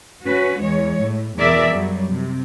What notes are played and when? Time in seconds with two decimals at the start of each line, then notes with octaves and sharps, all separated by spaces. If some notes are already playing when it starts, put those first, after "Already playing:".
0.25 C#4 F#4 B4
0.61 E2 G#3 C#5
1.03 A2
1.38 E2 B2 G#4 A#4 D5 E5
1.72 F#2 F#3 G3
2.12 C3